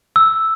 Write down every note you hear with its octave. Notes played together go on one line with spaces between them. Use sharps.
E6